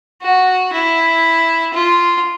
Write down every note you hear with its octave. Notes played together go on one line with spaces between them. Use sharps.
F#4
E4
F4